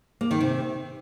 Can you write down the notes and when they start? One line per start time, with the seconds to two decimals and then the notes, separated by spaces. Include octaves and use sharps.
0.21 A#3
0.31 D#3
0.41 C3